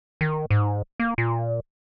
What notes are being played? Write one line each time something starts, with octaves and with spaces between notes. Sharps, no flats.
D#3
G#2
A#3
A#2